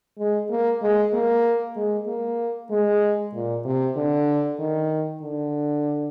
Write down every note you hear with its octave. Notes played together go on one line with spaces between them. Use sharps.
G#3
A#3
G#3
A#3
G#3
A#3
G#3
A#2
C3
D3
D#3
D3